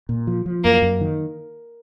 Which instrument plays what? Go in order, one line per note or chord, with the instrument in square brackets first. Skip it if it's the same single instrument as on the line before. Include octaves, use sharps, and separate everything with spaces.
[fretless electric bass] A#2
F3
F3
[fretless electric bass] F#2 [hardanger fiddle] A#3
[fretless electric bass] F#2
D#3